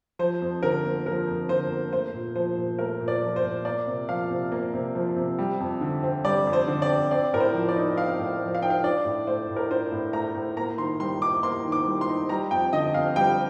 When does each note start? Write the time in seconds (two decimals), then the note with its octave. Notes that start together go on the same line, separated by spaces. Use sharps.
0.19 F3 C5
0.41 F2
0.63 D3 A#4
0.84 A#3
1.06 F3 A#4
1.28 F2
1.49 D3 C5
1.70 A#3
1.93 A3 C5
2.14 A#2
2.36 F3 C5
2.57 A#2
2.79 A3 A#4
3.00 A#2
3.08 D5
3.22 F3
3.36 C5
3.44 A#2
3.65 A#3 D5
3.87 C3
4.09 F3 F5
4.30 C3
4.52 A#3
4.74 C3
4.95 F3
5.16 C3
5.39 G3
5.60 F2
5.81 D3
6.03 C4
6.24 G3 D5
6.47 F2
6.53 C5
6.68 D3
6.82 D5
6.89 C4
7.11 C4 D5
7.33 A2 A#4
7.40 C5
7.54 F3
7.69 D5
7.76 D#4
7.97 C4 F5
8.19 A2
8.41 F3
8.55 F5
8.62 D#4 G5
8.70 F5
8.84 D4 D5
9.05 A2
9.27 A3 C5
9.49 A2
9.56 A#4
9.70 D4 C5
9.92 A2
10.13 A3 A#5
10.35 A2
10.57 A#3 A#5
10.78 D#3 C6
11.00 G3 C6
11.22 D#4 D6
11.43 A#3 C6
11.64 D#3
11.72 D6
11.86 G3
12.01 C6
12.08 D#4
12.29 G3 A#5
12.51 F2 G5
12.73 D3 D#5
12.94 F2 F5
13.16 G3 G5